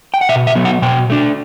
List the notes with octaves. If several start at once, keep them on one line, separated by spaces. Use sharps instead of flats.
G5
F#5
B2 E5
E5
F#3 B3
F#5
B2 G5
A3 D4